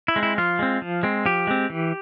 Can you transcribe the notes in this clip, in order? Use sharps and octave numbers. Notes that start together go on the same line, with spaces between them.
E4
G#3 C4
E4
F3 F4
G#3 C4
F3
G#3 C4
F3 G4
G#3 C4
E3